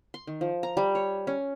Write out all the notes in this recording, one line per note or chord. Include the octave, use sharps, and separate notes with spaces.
C6
D#3
F3
A#5
G3
C#5
C#4